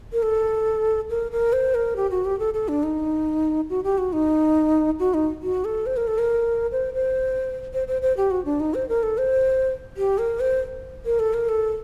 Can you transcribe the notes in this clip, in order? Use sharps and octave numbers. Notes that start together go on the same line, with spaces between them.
A#4
A4
A#4
A#4
C5
A#4
G4
F#4
G4
A4
A4
D4
D#4
F#4
G4
F#4
D#4
F#4
D#4
F#4
A4
C5
A#4
A4
A#4
C5
C5
C5
C5
C5
G4
F#4
D4
D#4
C5
A#4
A4
C5
G4
A#4
C5
A#4
A4
A#4
A4